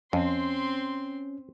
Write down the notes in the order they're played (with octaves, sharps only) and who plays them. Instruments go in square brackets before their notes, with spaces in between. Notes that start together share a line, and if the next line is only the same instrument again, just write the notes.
[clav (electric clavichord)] F2 [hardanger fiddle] C4 C6 [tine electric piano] C#4